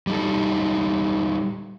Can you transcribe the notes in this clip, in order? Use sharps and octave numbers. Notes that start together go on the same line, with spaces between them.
G3 D#4 A4